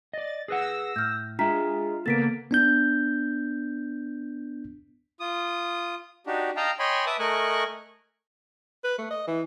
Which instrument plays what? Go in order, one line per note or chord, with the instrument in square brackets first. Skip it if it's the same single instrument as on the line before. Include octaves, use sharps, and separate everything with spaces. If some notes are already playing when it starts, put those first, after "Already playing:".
[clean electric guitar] D5 D#5 [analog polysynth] A6
[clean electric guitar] G#4 B4 F#5 [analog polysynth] E6 A#6
[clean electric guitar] A2 [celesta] F6 G6
[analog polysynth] G#3 [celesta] D4 A#5 B6 [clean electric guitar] F4 E5
[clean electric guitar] C#3 A4 [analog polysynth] A#3 B3 [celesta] A6 B6 D7
[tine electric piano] B3 D4 G6
[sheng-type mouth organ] F4 D#6
D4 D#4 F#4 G4
D#5 F5 G5 A5 A#5
C#5 D#5 G5 G#5 B5 C6
B4 E5 A5 D6 D#6
A3 A#4 D#5 G#5 C#6 F#6
[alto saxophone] B4
A3
D#5
E3